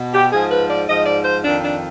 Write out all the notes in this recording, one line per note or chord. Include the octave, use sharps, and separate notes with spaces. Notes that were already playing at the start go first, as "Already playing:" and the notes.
Already playing: B2
G4
G#2 F3 G#4
B4
D5
G#2 F3 D#5
D5
C5
F2 D#3 D4
D4